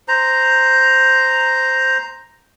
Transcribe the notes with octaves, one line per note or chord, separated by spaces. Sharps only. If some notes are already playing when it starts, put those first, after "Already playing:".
C5 A#5